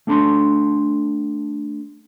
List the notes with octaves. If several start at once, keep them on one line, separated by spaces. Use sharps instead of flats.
A3 D4 A4 B5 C6